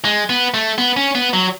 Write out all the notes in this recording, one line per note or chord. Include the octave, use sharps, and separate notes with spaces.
G#3
B3
A3
B3
C#4
B3
F#3